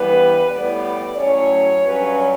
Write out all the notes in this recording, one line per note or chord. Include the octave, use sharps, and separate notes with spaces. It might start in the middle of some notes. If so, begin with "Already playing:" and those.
Already playing: G2 E3 G3 B3 B4
A2 G3 B3 D5
A2 F#3 A3 C#4 C#5
G2 F#3 C#4 B4